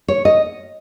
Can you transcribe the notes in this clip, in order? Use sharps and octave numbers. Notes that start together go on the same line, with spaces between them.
C#5
D#5